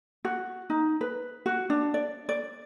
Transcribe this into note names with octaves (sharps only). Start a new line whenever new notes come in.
F#4
D#4
B4
F#4
D4
D5
D5